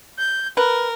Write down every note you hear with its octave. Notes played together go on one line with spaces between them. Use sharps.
G6
A#4 B4